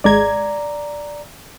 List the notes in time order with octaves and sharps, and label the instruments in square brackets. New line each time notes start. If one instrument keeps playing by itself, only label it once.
[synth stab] G#1 G#3 G#6 [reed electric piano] D5 A#5